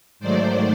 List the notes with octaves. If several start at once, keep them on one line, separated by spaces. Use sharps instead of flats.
G#2 D#3 F#3 A3 C5 D5